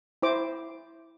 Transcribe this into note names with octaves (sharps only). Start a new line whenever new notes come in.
E4 C5 D6